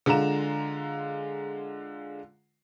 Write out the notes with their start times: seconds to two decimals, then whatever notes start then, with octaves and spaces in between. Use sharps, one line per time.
0.06 D3 G#3 F4 A#5 E7